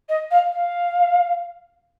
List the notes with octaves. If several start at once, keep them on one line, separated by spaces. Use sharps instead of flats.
D#5
F5
F5